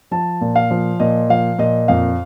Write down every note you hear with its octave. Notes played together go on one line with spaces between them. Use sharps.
F3 A5
A#2
F5
F3
A#2 D#5
F3 F5
A#2 D#5
F2 F5